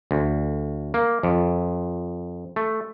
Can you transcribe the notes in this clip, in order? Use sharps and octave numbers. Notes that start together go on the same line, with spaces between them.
D2
A#3
F2
A3